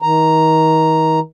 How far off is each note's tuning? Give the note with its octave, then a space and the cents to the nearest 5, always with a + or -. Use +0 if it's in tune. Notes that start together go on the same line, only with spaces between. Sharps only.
D#3 +35 A#5 +0